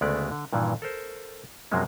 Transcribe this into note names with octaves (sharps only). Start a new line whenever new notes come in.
D2 C#3 G#3 A3 B3 D5
D3
G2 A#2 D#3 E3
A4 A#4 C5
F#2 C3 F3 F#3 G#3 A#3